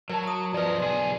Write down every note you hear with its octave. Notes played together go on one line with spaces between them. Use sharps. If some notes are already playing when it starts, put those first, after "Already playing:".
F#3 A#4 A5
A#5 D#6
F3 B4 D5 D#5
B1 G#4 D5 C6